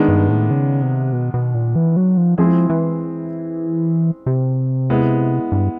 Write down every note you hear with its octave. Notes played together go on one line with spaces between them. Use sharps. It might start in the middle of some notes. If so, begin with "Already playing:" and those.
Already playing: D#3 G#3 B3 D4
G2
A2
C#3
C3
B2
B2
A#2
E3
F#3
F3
F3 G#3 C4 E4 G#4
E3
C3
G#3 B3 E4
G2